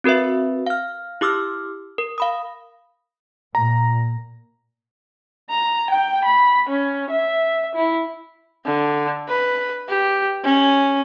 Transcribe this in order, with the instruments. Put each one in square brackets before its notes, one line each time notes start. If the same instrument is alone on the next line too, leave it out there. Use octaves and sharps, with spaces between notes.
[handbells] C4 F#4 A#4 B4 E5
F5 F6
E4 G4 D6 E6 F6
A#4
F5 B5 D#6
[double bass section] A#2 [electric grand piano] A#5
[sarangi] A#5
G5
B5
C#4
E5
E4
D3
B4
G4
C#4